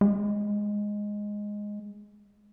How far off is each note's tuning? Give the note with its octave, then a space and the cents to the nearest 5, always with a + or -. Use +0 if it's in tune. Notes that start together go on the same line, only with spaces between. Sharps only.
G#3 -5